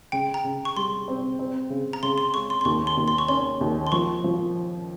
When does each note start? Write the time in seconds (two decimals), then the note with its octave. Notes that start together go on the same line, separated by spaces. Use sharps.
0.12 C#3 G5
0.34 A#5
0.44 C#3
0.65 C#6
0.76 G3 C6
1.08 C4
1.39 C4
1.70 C#3
1.93 A#5
2.03 C#3 C6
2.18 C6
2.34 G#3 C#6
2.50 C6
2.61 C6
2.65 D#2 C#6
2.87 C6
2.97 D#2
3.08 C6
3.18 C#6
3.28 C#4 C6
3.61 D#2
3.87 C6
3.92 F3 C#6
4.24 F3